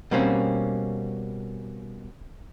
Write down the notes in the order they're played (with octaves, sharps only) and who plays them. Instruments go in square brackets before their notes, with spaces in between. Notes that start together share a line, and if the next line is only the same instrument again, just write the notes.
[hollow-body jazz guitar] B2 G3 A#3 C4 C#4